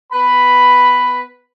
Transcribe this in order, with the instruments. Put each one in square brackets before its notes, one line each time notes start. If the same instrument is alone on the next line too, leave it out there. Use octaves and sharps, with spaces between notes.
[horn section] B3 B4 B5